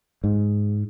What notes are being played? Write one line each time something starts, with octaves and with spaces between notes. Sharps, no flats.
G#2